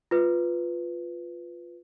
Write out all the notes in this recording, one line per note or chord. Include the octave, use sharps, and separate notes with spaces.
F4 B4